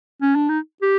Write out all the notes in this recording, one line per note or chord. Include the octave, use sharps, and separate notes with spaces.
C#4
D4
D#4
G4